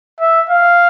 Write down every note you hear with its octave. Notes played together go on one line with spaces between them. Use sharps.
E5
F5